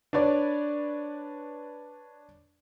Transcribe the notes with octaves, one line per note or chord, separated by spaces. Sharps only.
D4 B4 C#5 D5